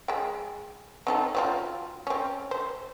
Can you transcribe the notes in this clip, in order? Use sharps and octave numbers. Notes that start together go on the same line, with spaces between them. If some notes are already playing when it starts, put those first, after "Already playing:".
G#3 G5
C4 D#4 A4
F#3 C4 F4
C4 C#4
C5